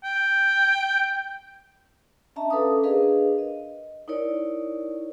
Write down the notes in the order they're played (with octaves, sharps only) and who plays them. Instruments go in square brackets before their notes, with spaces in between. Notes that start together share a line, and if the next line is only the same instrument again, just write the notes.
[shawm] G5
[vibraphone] C#4 D4 D#5 E5 A5 A#5
C#4 A4 B4 F5 D6 D#6
D4 G#4 A#4 B4 D#5 F5
D#5
D#4 E4 A#4 C#5 D5